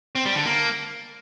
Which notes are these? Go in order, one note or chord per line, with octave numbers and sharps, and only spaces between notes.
C4
G3
D3
A#3